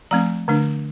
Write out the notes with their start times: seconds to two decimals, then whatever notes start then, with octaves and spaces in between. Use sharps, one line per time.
0.11 F3 A3 C4 A#5
0.48 D3 A3 D4